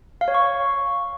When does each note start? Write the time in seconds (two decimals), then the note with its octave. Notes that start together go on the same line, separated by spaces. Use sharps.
0.21 F5
0.28 C#5
0.34 C#6